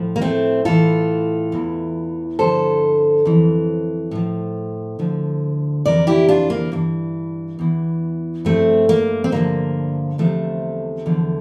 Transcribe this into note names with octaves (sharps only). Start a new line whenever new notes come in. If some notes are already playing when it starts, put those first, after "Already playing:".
Already playing: A2 F3
A#3
A3 C4
A2 E3 F4 A4
E2 E3
G2 D3 F3 A4 C5
F2 E3
A2 F3
D2 D3 F3
F2 C3 E3 A#4 D5
E4 G4
D4 F4
A#3
G2 E3
E2 E3
G2 F3 A3 C4
A#3
C4
G2 D3 F3 A#3
E2 C3 F3 A3
E2 D3 F3